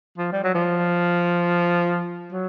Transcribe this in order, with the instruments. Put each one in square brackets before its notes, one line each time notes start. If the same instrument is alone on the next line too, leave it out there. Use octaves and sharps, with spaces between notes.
[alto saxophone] F3
G3
F#3
F3
F#3